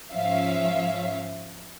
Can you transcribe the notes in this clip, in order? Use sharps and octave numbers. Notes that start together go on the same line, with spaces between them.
G#2 F3 C#4 E5 F5